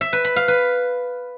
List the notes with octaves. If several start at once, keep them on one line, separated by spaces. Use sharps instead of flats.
E5
B4
B5
F5
B4